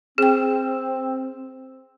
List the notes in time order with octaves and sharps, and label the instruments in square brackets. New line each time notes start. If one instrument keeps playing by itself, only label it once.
[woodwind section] C4 [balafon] G#4 G5